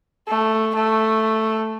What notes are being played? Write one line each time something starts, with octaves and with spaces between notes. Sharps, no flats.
A3
A3